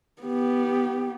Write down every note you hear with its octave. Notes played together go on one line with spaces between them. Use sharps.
B3 G4